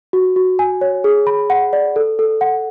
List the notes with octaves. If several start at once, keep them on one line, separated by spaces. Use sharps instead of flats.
F#4
F#4
G#5
C#5
G#4
B5
F#5
D5
A4
A4
F#5